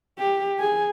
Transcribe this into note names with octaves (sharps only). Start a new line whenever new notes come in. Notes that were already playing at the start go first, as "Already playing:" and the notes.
G4
G#4 G#5